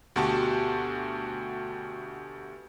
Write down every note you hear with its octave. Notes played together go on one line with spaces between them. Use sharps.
D2 B2 F#4 G4 A5 C#6